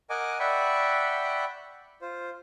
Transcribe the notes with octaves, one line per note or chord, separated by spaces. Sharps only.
A#4 D#5 F#5 G#5 D6
D5 E5 F#5 G5 B5 C#6
F4 C5